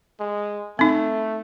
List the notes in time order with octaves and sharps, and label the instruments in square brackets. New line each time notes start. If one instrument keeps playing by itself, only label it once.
[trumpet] G#3
[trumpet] A3 [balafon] C4 D#4